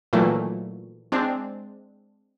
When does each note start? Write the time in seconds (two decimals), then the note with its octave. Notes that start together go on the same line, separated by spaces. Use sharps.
0.13 A#2 D#3 E3 F#3 A3 A#3
1.12 G#3 C4 D4